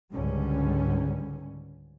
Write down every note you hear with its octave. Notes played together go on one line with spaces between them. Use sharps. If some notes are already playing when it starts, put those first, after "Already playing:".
C#2 G#2 D3 G3 C#4